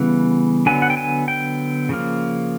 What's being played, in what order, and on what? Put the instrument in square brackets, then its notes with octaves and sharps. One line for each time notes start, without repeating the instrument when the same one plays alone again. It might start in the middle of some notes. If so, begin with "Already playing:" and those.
Already playing: [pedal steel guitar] C#3 E3 G3 B3 F#5
D3 F#3 B3 G#5
F#5
G5
G#5
G5
C#3 F3 A#3